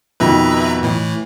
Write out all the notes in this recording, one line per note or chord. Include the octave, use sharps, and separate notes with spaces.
F2 B2 D#3 B4 E5 A#5
A2 E3